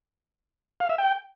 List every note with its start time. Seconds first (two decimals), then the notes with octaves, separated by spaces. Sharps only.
0.80 F5
0.89 E5
0.98 G5